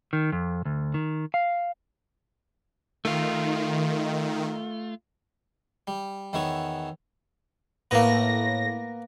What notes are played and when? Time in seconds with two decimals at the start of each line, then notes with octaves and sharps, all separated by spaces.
0.13 D#3
0.32 F2
0.65 D2
0.94 D#3
1.34 F5
3.05 D#3 A3 F4
5.87 G3
6.33 E2 D#3 E3 B3 C#5 C#6
7.91 A2 A#3 B3 A#6